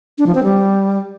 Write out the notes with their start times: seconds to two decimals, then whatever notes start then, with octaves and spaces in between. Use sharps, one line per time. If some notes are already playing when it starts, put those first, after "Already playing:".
0.18 D4
0.27 F3
0.35 C4
0.43 G3